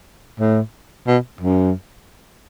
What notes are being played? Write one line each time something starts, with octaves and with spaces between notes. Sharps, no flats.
A2
B2
F#2